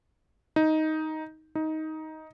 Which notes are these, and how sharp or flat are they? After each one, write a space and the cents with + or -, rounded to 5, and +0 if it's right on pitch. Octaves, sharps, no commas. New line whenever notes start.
D#4 +10
D#4 +15